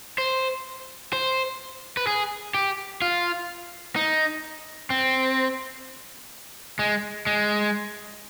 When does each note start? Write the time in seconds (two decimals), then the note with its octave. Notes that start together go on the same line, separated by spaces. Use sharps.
0.18 C5
1.13 C5
1.97 B4
2.07 G#4
2.54 G4
3.02 F4
3.96 D#4
4.90 C4
6.79 G#3
7.27 G#3